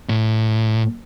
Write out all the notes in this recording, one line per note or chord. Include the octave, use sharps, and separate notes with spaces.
A2